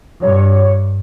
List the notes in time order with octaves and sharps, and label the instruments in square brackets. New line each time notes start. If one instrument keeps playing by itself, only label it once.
[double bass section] G2 [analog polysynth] C#5